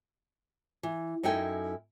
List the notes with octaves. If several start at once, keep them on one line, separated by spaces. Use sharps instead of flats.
E3
F#2 D#4 E4 A4 G5 G#5